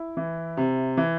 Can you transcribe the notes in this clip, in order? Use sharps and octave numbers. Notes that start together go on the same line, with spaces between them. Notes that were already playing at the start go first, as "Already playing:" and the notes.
Already playing: E4
E3
C3
E3